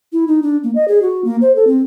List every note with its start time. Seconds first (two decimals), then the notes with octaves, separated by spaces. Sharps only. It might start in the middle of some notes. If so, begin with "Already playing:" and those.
0.13 E4
0.28 D#4
0.42 D4
0.63 A#3
0.75 D#5
0.88 G#4
1.02 F#4
1.25 A#3
1.42 C5
1.56 A4
1.67 C4